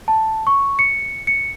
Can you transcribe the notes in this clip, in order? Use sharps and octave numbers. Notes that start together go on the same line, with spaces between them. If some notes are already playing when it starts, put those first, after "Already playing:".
A5
C#6
C#7
C#7